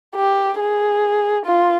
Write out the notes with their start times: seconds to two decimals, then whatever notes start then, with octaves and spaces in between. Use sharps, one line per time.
0.16 G4
0.59 G#4
1.46 F4